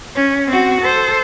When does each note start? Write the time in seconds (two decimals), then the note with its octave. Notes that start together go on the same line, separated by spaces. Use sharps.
0.15 C#4
0.48 C4 F#4
0.81 A4 C5